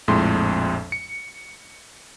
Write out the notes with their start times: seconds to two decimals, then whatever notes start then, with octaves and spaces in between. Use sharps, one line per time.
0.08 A#1 F2 A2 G#3 C6
0.92 C#7